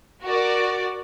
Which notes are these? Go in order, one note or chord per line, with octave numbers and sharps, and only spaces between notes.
F#4 A#4 D5